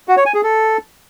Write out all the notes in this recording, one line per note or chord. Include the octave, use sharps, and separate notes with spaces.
F#4
C#5
G#5
G#4
A4